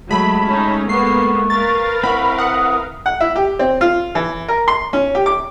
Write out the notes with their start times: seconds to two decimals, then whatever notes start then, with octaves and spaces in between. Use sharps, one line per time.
0.11 F#3 G#3 A3 A5 B5
0.48 C#4 D#4
0.89 A#3 B3 A4 C#6 C7
1.50 A#4 B4 F5 A6
2.03 C4 E4 F#5 B5 C#6
2.38 F#5 D#6
3.06 F#5
3.20 E4
3.36 G4
3.59 C4
3.81 F4
4.15 E3
4.48 A#4
4.68 C6
4.93 C#4
5.15 G4
5.26 D6